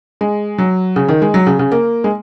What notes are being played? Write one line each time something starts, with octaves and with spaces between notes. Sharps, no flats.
G#3
F#3
C#3
D#3
G#3
F#3
C#3
C#3
A#3
G#3